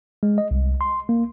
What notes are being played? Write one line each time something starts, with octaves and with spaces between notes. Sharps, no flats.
G#3
D#5
C2
C6
A#3